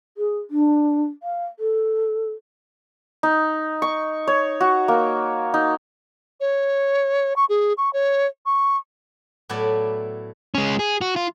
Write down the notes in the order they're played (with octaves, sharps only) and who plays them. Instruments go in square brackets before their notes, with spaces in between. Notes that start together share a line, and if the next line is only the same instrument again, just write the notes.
[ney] G#4
D4
F5
A4
[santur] D#4
C#6
C#5
F#4
A#3
D#4
[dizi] C#5
C#6
G#4
C#6
C#5
C#6
[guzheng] A2 F#3 B3 E4 D5
[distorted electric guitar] G#3 C#4
G#4
F#4
F4